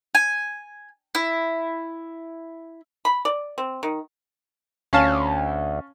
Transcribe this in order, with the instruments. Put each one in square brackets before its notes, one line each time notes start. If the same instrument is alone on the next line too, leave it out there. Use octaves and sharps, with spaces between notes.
[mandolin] G#5
E4
[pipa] B5
D5
C4
D#3
[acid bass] D2 [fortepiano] C#4 F5 A5